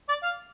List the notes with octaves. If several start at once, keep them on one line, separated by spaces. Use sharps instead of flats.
D5
F5